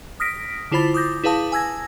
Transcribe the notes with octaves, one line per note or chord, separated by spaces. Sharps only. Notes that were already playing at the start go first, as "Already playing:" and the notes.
D#6 F6 A#6 B6 D7
D3 E4 F4 C5 B5 A6
D6 D#6 G6 A#6
E4 G#4 B4 F5 A5 D#6
G#5 E6 G#6 A#6